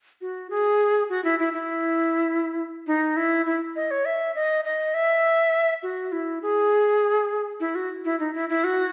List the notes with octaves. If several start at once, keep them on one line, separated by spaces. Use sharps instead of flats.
F#4
G#4
F#4
E4
E4
E4
D#4
E4
E4
D#5
C#5
E5
D#5
D#5
E5
F#4
E4
G#4
E4
F#4
E4
D#4
E4
E4
F#4